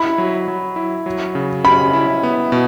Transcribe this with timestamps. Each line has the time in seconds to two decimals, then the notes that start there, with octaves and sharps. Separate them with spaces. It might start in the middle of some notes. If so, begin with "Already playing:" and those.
Already playing: E4 B5
0.18 F#3
0.48 F#3
0.76 E4
1.06 F#3
1.35 C#3
1.64 C#4 B5
1.93 E4
2.23 B3
2.52 B2